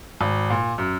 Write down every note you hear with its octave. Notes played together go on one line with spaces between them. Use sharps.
G#1
A#2
F#2